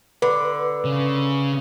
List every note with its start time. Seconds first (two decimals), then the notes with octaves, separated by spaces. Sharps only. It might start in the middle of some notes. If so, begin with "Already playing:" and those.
0.22 D3 B4
0.85 C#3